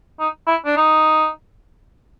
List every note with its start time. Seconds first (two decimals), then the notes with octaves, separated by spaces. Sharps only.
0.20 D#4
0.47 E4
0.65 D4
0.77 D#4